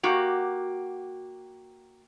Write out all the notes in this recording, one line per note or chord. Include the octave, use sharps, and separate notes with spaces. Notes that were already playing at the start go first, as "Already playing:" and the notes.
A#3 F#4 G4